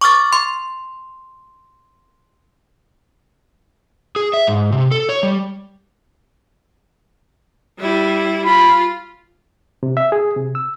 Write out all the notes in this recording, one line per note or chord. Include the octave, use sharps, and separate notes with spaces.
C#6 D6 F6 A6
C6
G#4
E5
G#2
C3
A4
C#5
G3
G3 E4
F4 B5
C3
E5
G#4
C3
E6